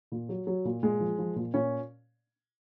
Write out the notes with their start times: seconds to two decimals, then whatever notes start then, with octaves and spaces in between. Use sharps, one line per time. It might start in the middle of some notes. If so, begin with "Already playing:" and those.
0.12 A#2
0.29 F#3
0.47 F#3
0.65 A#2
0.83 A#2 G#3
1.00 F3
1.19 F3
1.36 A#2
1.54 A#2 C#4